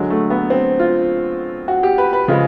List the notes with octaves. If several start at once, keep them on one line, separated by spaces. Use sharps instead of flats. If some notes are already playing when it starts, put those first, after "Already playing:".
Already playing: D3 F#3 G#3
A3
B3
C4
F4
F#4
G4
B4
B4
C#3 F3 G#3